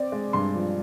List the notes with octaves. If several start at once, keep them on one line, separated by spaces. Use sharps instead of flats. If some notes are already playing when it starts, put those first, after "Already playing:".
Already playing: C4 D5
G#3
G2 C6
F3